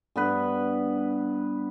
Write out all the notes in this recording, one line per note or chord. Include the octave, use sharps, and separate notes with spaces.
G2 B3 B4